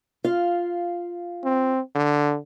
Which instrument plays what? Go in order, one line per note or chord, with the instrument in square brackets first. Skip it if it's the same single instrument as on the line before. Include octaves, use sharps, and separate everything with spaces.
[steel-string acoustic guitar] F4 F5
[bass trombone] C4
D3